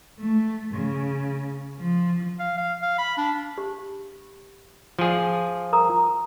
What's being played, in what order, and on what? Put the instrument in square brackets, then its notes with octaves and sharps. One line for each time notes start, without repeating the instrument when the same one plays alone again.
[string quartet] A3
C#3
F3
[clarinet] F5
F5
F5
B5
D4
[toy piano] G4
[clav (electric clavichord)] F3 G#4
[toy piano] A#4 A#5 D#6